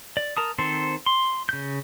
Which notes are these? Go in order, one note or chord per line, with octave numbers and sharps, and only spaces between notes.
D5
A#4 A5 D#6
D#3 C4 A4 C5
C6
C#3 G6